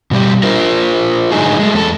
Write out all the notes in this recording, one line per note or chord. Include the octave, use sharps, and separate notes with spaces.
B2 G3 G4
F4 A#4 C5
A2 D3 F#3 D#4 G#4
G#3 A3
E2 A4